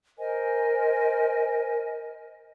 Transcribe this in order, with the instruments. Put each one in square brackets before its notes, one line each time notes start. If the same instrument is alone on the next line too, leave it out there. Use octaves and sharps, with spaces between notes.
[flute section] A#4 C5 D#5 G#5